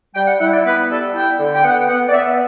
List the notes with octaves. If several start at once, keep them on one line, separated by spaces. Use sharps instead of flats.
G3 G5
F#5
E4 F#5
D5
B3 B4
G3 A4
E4 G5
D3
G5
B3 F#5
B3 F#5
D5
B3 E5
E5